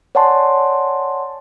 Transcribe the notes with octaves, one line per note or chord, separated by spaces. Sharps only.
C#5 D5 F#5 G#5 A5 C6